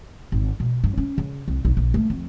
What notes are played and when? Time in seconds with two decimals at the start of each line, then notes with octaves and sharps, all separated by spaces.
0.32 G#1
0.60 B2
0.84 G2
0.98 C#4
1.18 C#3
1.48 C2
1.65 B1
1.77 A#1
1.94 A3
2.10 F2